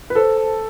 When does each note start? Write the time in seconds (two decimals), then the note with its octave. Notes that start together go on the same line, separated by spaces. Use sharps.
0.10 B4
0.15 A4 C5
0.37 A5